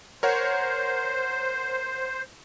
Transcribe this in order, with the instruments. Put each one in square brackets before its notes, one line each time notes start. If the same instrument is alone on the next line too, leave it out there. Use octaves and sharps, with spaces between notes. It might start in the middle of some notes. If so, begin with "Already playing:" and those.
[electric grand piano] A#4 C#5 F#5 [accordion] C5